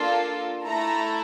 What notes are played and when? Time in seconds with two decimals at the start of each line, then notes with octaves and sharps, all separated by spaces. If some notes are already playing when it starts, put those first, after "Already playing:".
Already playing: A#3 D4 F4 A4
0.65 A3 E4 A4 A#5